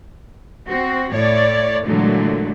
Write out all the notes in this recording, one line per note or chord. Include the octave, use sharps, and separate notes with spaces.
C4 F#4
A2 C#5 D5
A#2 D3 E3 F#3 G#3 A3